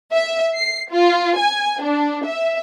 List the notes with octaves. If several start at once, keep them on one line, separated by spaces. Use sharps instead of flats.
E5
C7
F4
G#5
D4
E5